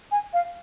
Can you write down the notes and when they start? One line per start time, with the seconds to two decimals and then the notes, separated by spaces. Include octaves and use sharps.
0.11 G#5
0.34 F5